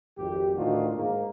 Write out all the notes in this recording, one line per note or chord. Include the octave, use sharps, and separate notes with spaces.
G#1 F2 G4
D2 A2 D#3 D4 F4 F#4
G#2 A#3